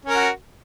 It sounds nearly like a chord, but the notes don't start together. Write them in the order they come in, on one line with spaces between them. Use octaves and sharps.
C#4 A#4 F#4